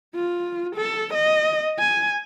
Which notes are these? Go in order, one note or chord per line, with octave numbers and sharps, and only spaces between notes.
F4
A4
D#5
G#5